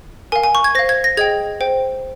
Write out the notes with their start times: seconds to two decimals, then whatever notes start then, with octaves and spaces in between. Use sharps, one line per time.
0.32 A#4 F5 G#5
0.44 G#5
0.55 C#6
0.64 G#6
0.75 C5 F5 A#6
0.89 G#6
1.04 A#6
1.17 G#4 D#5 G5 G#6
1.61 C5 G5